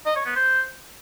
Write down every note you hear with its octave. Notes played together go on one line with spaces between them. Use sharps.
D#5
C#5
B3
C5